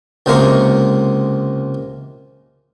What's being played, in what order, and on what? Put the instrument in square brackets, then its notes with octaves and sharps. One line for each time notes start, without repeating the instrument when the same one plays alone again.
[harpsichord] C#2 C3 G#3 A#3 A#4 C#6